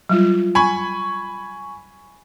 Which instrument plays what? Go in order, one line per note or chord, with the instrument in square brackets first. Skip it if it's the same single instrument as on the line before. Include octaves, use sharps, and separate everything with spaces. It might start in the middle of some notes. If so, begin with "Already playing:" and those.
[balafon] F#3 G3 F4
[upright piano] G#5 B5 C#6